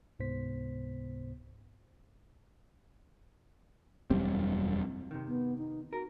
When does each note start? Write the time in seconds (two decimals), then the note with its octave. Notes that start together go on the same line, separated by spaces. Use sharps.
0.19 C#2 G#2 C3 B3 C5 B6
4.10 E1 F#2 G3 C4
5.11 C3 D#3
5.28 B3
5.58 D#4
5.93 F#4 A#4